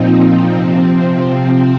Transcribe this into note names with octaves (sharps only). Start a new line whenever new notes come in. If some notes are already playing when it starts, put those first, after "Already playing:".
Already playing: A#2 F3 C4 D#4
C3 F3 C4